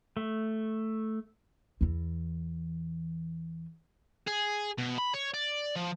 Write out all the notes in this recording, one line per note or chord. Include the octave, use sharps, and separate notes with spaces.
A3
E2 E3
G#4
B2
B5
C#5
D5
F3